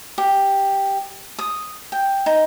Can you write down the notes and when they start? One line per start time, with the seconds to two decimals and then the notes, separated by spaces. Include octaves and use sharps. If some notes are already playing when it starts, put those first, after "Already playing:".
0.18 G4
1.39 D#6
1.92 G5
2.26 D#4